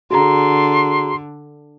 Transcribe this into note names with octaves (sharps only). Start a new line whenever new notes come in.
D3 F#4 G#4 A#5 C6